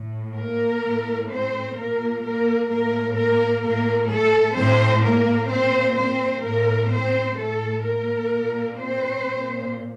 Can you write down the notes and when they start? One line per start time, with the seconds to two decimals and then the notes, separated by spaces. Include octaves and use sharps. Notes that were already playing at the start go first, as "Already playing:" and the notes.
Already playing: A2
0.35 A#3 A#4
0.83 A2
1.29 C4 C5
1.75 A#2 A#3 A#4
2.23 A#3 A#4
2.69 A2 A#3 A#4
3.16 A#3 A#4
3.63 A2 A#3 A#4
4.10 A3 A4
4.56 A2 C4 C5
5.03 A#3 A#4
5.50 A#2 C4 C5
5.96 C4 C5
6.43 A2 A#3 A#4
6.90 C4 C5
7.37 A2 A3 A4
7.84 A#3 A#4
8.31 A#2
8.77 C4 C5
9.24 A#2